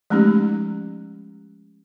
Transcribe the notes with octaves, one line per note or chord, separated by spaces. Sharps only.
F3 G#3 A3 C#4 D#4 G4